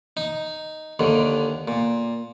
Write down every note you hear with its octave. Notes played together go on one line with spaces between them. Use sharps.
D#4
D#2 D3 D#3
A#2